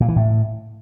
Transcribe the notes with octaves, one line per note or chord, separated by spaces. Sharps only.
A#2
E3
A2